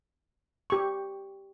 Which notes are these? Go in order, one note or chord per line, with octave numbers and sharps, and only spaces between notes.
G4 C#6